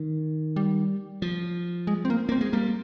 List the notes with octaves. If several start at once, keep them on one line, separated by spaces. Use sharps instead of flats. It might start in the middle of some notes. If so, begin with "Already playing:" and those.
Already playing: D#3
G3
F3
G#3
C4
A#3
A#3 C4
G#3
G3 A#3